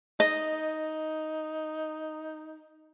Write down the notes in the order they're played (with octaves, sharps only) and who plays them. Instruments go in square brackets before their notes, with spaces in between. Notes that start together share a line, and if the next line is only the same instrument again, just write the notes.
[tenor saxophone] D#4 [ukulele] D#5